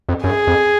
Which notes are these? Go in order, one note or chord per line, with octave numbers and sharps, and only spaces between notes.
F2
F#2 G#4
F2